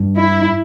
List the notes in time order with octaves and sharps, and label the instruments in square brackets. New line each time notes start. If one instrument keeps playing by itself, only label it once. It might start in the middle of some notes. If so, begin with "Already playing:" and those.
Already playing: [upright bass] G2
[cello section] E4